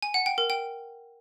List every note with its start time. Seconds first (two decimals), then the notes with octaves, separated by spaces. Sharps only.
0.03 G#5
0.14 F#5
0.26 G5
0.38 A#4
0.50 G5